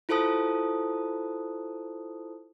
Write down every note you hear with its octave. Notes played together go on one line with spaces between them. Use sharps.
E4 F4 A4 C5 A5 D#6